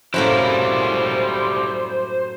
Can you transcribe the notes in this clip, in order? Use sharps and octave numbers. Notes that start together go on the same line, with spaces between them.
F#2 A2 G3 A#3 E4 C5